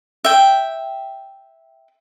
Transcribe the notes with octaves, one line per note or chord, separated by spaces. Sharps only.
E5 G5